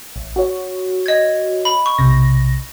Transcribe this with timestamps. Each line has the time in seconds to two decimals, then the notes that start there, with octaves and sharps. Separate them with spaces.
0.16 A1
0.36 F#4 C#5
1.06 D#5 G#6
1.65 B5
1.86 C#6
1.98 B1 C3 A#6